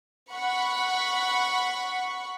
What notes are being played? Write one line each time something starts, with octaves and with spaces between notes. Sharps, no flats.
F#5 B5 C#6